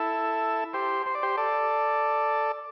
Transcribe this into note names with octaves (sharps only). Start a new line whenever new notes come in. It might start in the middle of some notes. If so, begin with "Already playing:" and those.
Already playing: E4 A4
G4 C5
C5
D5
G4 C5
A4 D5